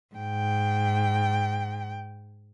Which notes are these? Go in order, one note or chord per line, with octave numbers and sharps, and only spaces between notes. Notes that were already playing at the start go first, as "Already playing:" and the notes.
G#2 G5